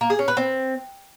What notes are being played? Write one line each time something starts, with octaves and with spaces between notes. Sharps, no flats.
A#3
G#4
C#4
B4
C4